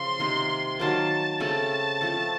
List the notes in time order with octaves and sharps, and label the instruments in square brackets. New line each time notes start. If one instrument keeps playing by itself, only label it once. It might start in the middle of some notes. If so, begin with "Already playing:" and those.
Already playing: [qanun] C#3 F3 [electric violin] C6
[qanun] C3 D#3 A#3
[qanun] D#3 F#3 A#3 [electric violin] A5
[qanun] C#3 A3 C4 [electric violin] A5
[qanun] F3 A3 C4